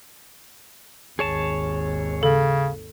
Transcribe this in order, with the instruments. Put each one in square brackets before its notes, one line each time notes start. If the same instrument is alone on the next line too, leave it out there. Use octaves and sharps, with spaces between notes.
[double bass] G#1 D#2 [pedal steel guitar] G#4 C#5 A5
[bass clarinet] C#3 [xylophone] A4